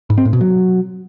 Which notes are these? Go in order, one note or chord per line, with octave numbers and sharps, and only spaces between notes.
G#2
C4
A2
B2
F#3